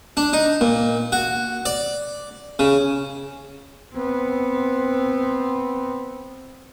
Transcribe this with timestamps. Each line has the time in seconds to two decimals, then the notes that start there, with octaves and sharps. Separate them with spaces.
0.17 D4
0.33 D#4
0.61 A#2
1.12 F#4
1.66 D5
2.59 C#3
3.93 B3 C4